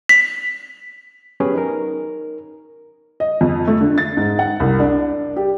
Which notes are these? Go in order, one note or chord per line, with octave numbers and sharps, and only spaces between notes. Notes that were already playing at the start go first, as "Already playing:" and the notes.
B6
F#3 B3 C#4 G4 G#4 B4
D#4 A#4
D#5
F2
A3
D3
A6
G#2
F#5
C2
D4
G4